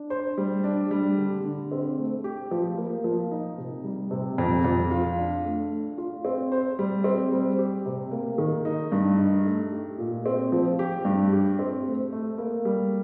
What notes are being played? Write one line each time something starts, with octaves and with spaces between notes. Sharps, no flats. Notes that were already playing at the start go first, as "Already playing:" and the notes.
Already playing: D4
C5
G3
D4
G3
D3
D3
C4
A3
G4
F3
A#3
F3
D#4
C3
G3
C3
F2
F2
F4
D4
A3
A3
F4
C4
C5
G3
C4
G3
G4
C3
A#3
D#3
D#4
G2
D#4
A3
G4
A#2
C4
F3
G4
G2
G4
C4
A3
A3
A#3
G3